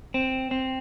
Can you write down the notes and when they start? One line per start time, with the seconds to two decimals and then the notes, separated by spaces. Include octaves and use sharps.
0.14 C4
0.51 C4